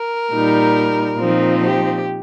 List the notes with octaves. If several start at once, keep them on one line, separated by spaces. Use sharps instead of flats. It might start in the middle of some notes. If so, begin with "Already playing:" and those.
Already playing: A#4
A#2 G3 D#4
A#2 F3 C4 D#4
G4